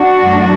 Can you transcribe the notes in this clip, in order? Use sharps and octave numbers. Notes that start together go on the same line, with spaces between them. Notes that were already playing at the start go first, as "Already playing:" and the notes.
Already playing: D4 F#4
F#2 E3 A3